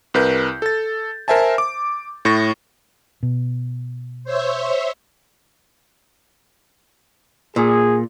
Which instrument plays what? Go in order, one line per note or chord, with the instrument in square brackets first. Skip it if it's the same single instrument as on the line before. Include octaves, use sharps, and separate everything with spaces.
[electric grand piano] C2 A#4 B4 G6
A4 A6
A#4 C5 E5 G#5 A5
D6
A2 C#6 A6 A#6
[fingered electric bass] B2
[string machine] C5 C#5 E5
[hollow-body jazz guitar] A#2 [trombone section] G#4